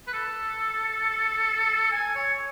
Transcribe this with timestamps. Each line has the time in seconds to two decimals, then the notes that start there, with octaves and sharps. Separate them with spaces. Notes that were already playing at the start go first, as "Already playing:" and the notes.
0.08 B4
0.13 A4
1.92 G#5
2.15 C#5